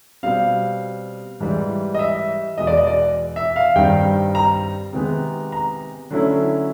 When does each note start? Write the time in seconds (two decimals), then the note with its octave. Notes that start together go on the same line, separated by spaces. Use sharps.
0.23 B2 G3 C4 F5
1.40 G#2 E3 G3
1.94 D#5
1.99 E5
2.58 E2 B2 G#3 D#5
2.67 D5
2.77 D#5
2.87 D5
3.36 E5
3.56 F5
3.75 G2 D#3 G3 C4 G5
4.35 A#5
4.93 C3 D#3 G#3 B3
5.52 A#5
6.10 D3 F#3 A3 C#4 E4